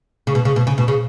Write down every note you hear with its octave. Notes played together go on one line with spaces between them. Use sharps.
C#3
B2
C#3
B2
C#3
B2
C#3